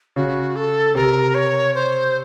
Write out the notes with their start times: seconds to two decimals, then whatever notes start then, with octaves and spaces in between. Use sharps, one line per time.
0.16 C#3 F#4
0.56 A4
0.95 C3 A#4
1.34 C#5
1.75 C5